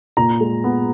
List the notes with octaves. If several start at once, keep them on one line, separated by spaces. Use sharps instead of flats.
A#2 A#5
G#3
B3